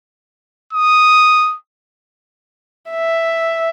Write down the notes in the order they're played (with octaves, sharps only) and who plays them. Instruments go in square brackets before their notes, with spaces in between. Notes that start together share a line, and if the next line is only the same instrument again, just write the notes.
[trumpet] D#6
[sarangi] E5